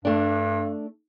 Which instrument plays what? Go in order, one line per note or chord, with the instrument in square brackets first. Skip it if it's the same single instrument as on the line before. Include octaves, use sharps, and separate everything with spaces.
[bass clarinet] G2 [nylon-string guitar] A3 D4